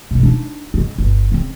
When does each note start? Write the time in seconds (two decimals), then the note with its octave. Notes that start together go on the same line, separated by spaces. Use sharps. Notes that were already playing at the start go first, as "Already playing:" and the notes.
0.11 F#2 B2
0.23 D4 D#4
0.74 C#3 G#3
0.98 G1
1.32 C#3 C4